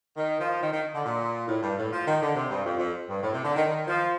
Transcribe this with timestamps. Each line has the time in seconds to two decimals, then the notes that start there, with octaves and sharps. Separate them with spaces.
0.16 D#3
0.39 F3
0.61 D#3
0.71 D#3
0.94 D3
1.04 A#2
1.48 A2
1.62 G2
1.77 A2
1.92 F3
2.06 D#3
2.21 D3
2.35 C3
2.50 G2
2.64 F2
2.78 F2
3.08 G2
3.22 A2
3.33 C3
3.44 D3
3.56 D#3
3.66 D#3
3.88 F3